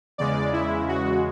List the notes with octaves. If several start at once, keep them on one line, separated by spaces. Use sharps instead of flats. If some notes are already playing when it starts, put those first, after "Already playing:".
E2 C#3 G#3 D5
E4
F#4